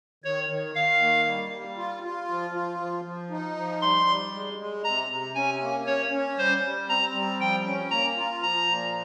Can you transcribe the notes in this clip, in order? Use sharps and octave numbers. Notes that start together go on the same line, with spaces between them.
D#3 C#5
D#3
D#3 F5
A#3
G3
G3
F4
F4
F3
F4
F3
F3
D#4
F3
G3 C6
G3
G#3
G#3
C3 A#5
C3
C#4 G#5
A#3
C#4 C#5
C#4
G3 C5
G3
C4 A#5
G3
F3 G5
C#4
A#3 A#5
F4
F3 A#5
A#2